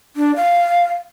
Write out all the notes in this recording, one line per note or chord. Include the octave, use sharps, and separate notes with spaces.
D4
F5